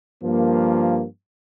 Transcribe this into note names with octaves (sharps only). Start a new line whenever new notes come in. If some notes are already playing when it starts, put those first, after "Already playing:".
G2 F3 A#3